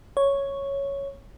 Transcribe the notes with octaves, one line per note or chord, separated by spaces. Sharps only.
C#5